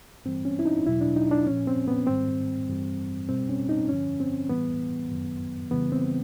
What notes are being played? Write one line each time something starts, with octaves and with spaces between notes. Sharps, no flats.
G2 E3 G3 C4
C#4
E4
D#4
E2 B2 F#3 E4
D4
D#4
D4
A#2 F3 C#4
C4
B3
G#2 D#3 G3 C4
G2 E3 G3
B2 G3 C4
C#4
D#4
G2 D3 F3 C#4
C4
A2 E3 G3 B3
F#2 D#3 F#3
F2 C#3 E3 G3 B3
C4